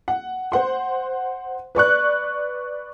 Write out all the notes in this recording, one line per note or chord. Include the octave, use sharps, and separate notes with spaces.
F#5
C5 F#5 C6
B4 D5 C#6 F#6